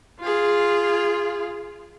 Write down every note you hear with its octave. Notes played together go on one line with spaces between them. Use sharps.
F4 G#4